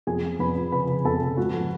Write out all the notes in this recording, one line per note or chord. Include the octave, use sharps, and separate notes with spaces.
F2 G#4 G#5
F3
F2 B4 B5
F3
C#3 B4 B5
C#3
F2 A4 A5
C#3
G#2 F#4 F#5
F3